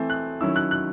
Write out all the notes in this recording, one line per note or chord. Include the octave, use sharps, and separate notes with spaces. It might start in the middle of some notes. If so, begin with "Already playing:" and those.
Already playing: E3 A3 C4
F#6
D#3 F#3 C#4 E4 E6
F#6
F#6